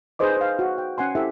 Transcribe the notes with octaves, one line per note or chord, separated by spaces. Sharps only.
D#4 G#4 B4 C5 D#5 D6
C5 F5
F#4
G5
C#4 F#5 G#5 C6
E4 G4 A4 C5 E5